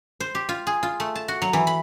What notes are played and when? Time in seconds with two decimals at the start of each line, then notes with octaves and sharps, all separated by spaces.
0.20 C5
0.35 G4
0.49 F4
0.67 G#4
0.83 F4
1.00 A3
1.15 A5
1.28 F#4
1.42 F#3
1.53 E3
1.67 B5